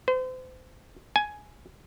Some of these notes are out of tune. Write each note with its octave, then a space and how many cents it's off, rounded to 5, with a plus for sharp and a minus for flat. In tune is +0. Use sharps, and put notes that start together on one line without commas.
C5 -35
G#5 +10